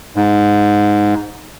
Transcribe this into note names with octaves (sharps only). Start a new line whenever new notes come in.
G#2